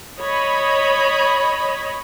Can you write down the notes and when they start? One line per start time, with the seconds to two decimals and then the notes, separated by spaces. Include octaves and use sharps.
0.21 C#5 D#5 B5